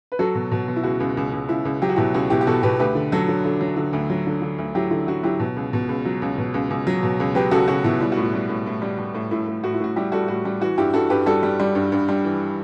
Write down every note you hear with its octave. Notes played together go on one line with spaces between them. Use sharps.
B4
F#3 F#4 A4
B2
B2
B2
E4
C#2 F#4
C#2
C#2
C#2
C#2 E4
C#2
F#3 G4
F#4
B2 E4 G4
C#2 F#4
B2 E4 G4
G4
B2 F#4 A4
B2 G4 B4
D2 G4 B4
D3
F#3 F#4 A4
D3
D3
F#3
D3
D2
F#3
D3
D3
D2
F#3 E4 G4
D3 E4
F#3 F#4
F#3 E4 G4
B2
C#2
B2
C#2
F#3
C#2
B2
C#2
C#2
F#3
B2
C#2
F#3 G4 B4
C#2 F#4 A4
C#2 F#4
B2 E4
G3 E4
A2 F#4
E4
G3
A2
A2
G3
G3
A2
A2 E4
A2
A2 F#4
E4
A2 F#4
G3 E4 G4
G3 F#4 A4
A2 F#4
G3
E3 F#4
G2 E4 G4
G2 F#4 A4
G2 G4 B4
G3 F#4 A4
G3
G3
G2
G2
G3
E3